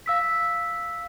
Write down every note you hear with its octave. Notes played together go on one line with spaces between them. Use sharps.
F5 E6 B6